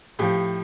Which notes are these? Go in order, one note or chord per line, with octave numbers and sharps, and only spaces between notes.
A2 F3 G4